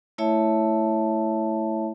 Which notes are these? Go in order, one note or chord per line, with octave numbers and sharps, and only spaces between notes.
A3 E4 C#5 E5 A5